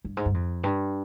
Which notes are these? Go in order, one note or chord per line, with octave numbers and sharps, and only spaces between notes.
G2
G#2
G2
F2
G2